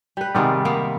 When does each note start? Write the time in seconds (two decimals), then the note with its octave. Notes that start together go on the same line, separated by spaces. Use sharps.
0.17 G3 B4
0.35 C3 D#3 G3 G#3 B3 D5
0.65 A#3 B3